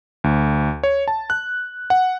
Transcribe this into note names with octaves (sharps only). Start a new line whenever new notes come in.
D2
C#5
A5
F#6
F#5